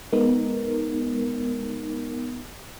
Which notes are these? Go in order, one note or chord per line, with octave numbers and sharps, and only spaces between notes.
G#3 B3 D#4 A#4